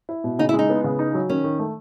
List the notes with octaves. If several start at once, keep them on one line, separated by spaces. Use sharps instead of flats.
E4
B2
C#3 D#4
E4
G#3
D#4
B3
C#3
D#4
F#3
D#3 C#4
D#3
A3